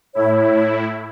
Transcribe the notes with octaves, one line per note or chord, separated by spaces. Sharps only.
A2 E4 C#5